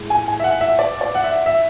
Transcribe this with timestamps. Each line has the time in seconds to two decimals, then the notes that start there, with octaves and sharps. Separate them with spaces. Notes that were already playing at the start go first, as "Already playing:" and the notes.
Already playing: A2 G#3
0.10 G#5
0.28 G#5
0.40 E5
0.44 F#5
0.61 E5
0.79 D5
1.01 D5
1.15 F#5
1.24 E5
1.46 E5